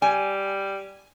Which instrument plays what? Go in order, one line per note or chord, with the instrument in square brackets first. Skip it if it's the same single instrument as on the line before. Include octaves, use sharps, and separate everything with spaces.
[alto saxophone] G3 [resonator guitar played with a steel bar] G#5